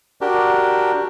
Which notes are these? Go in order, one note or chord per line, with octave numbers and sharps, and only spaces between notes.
D4 F#4 G4 A#4